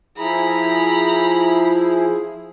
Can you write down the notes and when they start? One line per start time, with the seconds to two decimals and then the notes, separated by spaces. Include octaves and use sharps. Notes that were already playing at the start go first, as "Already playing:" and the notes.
0.18 F3 E4 G#4 A#5 B5